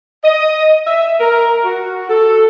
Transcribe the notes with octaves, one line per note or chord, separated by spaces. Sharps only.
D#5
E5
A#4
F#4
A4